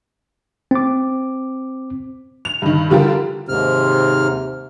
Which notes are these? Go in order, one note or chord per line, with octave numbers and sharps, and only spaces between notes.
C4 D6
F7
G2 D#3
D3 G3 F4 G4 A#4
D#2 G#2 C3 F6